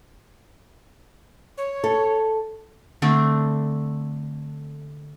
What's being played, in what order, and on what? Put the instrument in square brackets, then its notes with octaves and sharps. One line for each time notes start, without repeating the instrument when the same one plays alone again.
[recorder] C#5
[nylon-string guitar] A4
[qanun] D3 A3 C4 D4